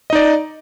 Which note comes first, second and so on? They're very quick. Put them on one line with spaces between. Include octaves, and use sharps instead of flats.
D#5 D#4 D5